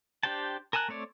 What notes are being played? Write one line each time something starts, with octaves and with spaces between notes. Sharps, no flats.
D4 G4 C5 G5 A5
A#4 G#5 A5 E6 F#6
A3 C4 C#5 D5